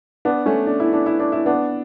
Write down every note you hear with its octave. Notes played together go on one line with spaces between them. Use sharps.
B3 D4
A3 C#4
D4
E4
D4
E4
D4
E4
B3 D4